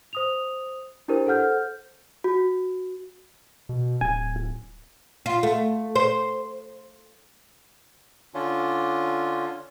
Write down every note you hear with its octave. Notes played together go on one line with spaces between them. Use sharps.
C5 D#6 F7
D4 E4 G4 A#4 C5
A4 C5 F#5 F6 G6
F#4
B2
D1 G#5
F4
A3
C5
D3 C#4 D4 F4